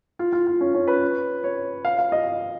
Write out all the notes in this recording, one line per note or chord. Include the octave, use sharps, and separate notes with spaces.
F4
F4
F4
C#4
C#4
B4
C#5
F5
F5
D#5